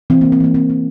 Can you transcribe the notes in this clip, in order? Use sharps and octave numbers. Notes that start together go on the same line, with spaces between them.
E3 C4
E3 A#3
C4
E3 A#3
E3 C4
A#3